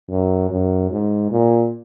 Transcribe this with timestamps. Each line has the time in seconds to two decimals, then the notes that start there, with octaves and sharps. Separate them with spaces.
0.10 F#2
0.50 F#2
0.91 G#2
1.31 A#2